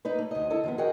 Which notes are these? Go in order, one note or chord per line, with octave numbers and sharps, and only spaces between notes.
A#3 D#4 B4
A3
D2 D#5
E4 A4 D#5
D#3 F3 B3
F#4 G#4 A#4 D#5 F#5 G5